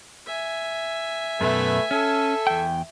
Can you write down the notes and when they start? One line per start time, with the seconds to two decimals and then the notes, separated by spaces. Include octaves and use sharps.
0.27 E5 G#5
1.41 F#2 B2 A3 B4
1.91 C#4 A4
2.47 E2 G5